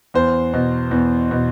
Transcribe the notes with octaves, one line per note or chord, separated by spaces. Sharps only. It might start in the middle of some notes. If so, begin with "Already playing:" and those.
E2 C5
B2
E2
B2